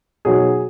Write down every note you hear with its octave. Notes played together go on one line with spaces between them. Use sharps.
B2 F#3 B3 D#4 F#4 G#4